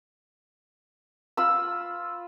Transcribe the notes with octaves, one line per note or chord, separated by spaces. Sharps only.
F4 B5 E6